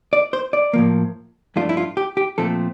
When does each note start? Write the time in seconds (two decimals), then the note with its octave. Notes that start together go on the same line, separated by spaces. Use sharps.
0.13 D5
0.33 C5
0.53 D5
0.73 A2 F3 A#3
1.56 G2 F3 A3 D4 F4
1.69 E4
1.77 F4
1.97 G4
2.17 G4
2.38 A#2 F3 A3 C4 A4